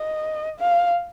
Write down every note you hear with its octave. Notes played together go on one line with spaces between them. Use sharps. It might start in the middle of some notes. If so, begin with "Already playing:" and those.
Already playing: D#5
F5